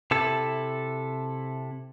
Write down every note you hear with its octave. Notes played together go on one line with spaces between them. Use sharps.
C3 E4 A4